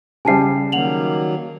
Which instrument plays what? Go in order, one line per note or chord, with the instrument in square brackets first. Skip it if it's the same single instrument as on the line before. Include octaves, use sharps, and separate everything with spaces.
[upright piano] C#3 G3 [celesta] G#5 A5 C7
[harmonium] D#3 F#3 A#3 [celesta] F#5 F7 F#7